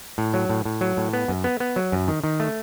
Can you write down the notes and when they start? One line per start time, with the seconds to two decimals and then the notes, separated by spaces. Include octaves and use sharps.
0.18 A2
0.34 F#3
0.49 A2
0.65 A2
0.81 F#3
0.97 A2
1.13 B3
1.28 F#2
1.44 B3
1.60 B3
1.76 F#3
1.92 F#2
2.08 D#3
2.24 D#3
2.40 A3